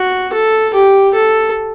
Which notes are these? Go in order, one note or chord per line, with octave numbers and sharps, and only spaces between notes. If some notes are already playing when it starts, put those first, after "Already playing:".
Already playing: F#4
A4
G4
A4